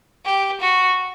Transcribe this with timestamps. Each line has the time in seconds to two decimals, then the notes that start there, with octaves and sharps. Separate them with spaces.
0.25 G4
0.61 F#4